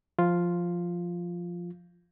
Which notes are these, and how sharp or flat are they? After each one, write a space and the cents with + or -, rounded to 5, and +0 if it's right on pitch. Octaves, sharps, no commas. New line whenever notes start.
F3 +0 F4 +0